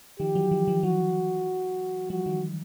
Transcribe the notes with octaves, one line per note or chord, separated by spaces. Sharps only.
D#3 F3 G4
E3 F#3
D#3 F3
D#3 F3
E3 F#3 F#4
F3 G3 F#4
D#3 F3